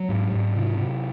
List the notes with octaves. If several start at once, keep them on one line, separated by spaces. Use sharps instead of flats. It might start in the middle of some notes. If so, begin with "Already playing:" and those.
Already playing: F#3
G#2
G#2
C3
C3